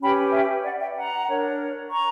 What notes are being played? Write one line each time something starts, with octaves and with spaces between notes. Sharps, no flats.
C#4 G4 B4 G5 B5
E5 G5
D5 F#5
E5 G5
F#5 A#5
D4 A#4 C#5
A#5 C#6